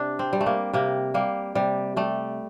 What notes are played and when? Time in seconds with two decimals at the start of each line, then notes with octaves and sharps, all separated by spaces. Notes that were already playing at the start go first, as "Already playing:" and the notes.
Already playing: C3 D4
0.19 C4
0.33 G3
0.41 A3
0.46 A#3
0.73 C3 A#3
1.14 G3 A#3
1.55 C3 G3
1.96 G3 A3